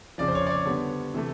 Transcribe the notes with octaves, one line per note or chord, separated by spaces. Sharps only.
F2 C#3 F3 D5
C5
C#5
D5
C#5
D3 G3 B3
C3 E3 A3